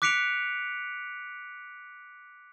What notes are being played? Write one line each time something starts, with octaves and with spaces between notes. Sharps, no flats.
D6 F#6 B6 C#7 D7 F7